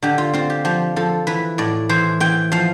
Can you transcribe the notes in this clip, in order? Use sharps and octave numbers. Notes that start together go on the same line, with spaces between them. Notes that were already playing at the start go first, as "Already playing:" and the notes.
D3 G4
F4
C4 F4
G4
F3 G4
F3 A4
E3 B4
A2 D5
E3 C5
E3 G5
F3 F5